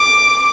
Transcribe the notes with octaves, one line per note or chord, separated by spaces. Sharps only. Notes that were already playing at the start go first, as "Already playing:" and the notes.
Already playing: D6